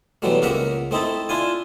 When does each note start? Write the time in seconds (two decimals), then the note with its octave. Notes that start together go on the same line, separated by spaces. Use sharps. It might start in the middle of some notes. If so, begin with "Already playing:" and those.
0.22 B2 E3 F#3 G3 A3
0.42 C#2 A#3 A#4 E5 F#5
0.91 A3 C4 D#4 E4 A4
1.29 D4 E4 F4 G#5